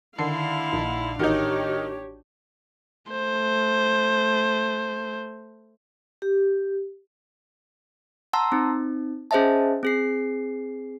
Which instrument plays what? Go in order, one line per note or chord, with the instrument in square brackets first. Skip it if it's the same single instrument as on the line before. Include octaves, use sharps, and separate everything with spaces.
[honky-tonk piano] D3 [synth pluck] D#3 C7 [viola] E4 F5
[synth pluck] A#1 A#2 D#4
[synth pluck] A1 F#4 G6 [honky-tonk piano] D#3 D#4 [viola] D4 [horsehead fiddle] G4 C#5
[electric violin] A3 C5
[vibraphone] G4
[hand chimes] F#5 A5 A#5 C6 E6
C4 D#4
C#4 G#4 C5 D#5 E5 A5
C4 G#4 C7